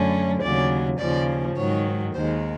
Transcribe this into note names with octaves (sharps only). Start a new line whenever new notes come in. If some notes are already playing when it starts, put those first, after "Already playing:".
Already playing: F#2 D3 F#3 A3 C#4
D#2 C#3 F#3 D5
D#2 C#3 F3 D5
G#2 D#3 F#3 C#5
D#2 D#3 G#3 C5